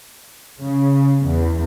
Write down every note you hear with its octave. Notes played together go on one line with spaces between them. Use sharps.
C#3
E2